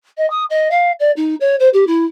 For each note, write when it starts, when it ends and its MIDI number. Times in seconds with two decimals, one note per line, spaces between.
0.17 0.28 75
0.30 0.44 87
0.50 0.69 75
0.71 0.92 77
1.00 1.11 74
1.17 1.35 63
1.41 1.56 73
1.60 1.69 72
1.74 1.85 67
1.87 2.06 64